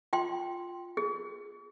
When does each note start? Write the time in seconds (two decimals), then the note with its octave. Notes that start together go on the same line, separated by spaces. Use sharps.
0.13 F4 G5 C6
0.97 G#4